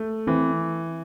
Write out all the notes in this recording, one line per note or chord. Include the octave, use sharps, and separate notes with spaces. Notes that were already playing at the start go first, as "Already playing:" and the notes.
Already playing: A3
E3 C4